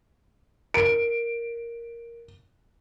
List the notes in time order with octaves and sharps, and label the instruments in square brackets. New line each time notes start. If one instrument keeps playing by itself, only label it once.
[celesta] A#4 [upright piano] D7